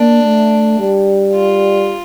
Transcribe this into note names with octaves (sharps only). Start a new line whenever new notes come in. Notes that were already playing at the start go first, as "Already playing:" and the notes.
Already playing: A#3 D4
A3
G3
F4